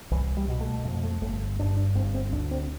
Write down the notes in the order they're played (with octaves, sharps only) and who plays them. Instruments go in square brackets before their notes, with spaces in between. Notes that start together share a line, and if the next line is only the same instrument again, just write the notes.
[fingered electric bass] C2 E3
G3
B2
A3
F2 A3
A3
G1 A3
G2 D4
D4
G1 C4
C4
D2 D4
C4